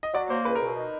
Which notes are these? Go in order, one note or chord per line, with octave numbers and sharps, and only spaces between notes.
D#5
F#3 D5
A#3 C5
C#2 B4
A#4
B2
D#4